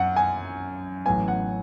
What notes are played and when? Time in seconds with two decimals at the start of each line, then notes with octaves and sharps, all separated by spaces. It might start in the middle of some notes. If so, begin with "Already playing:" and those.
Already playing: F#2 F#3 F#5
0.16 G#5
1.06 A1 A2 F#3 B3 G#5
1.28 F#5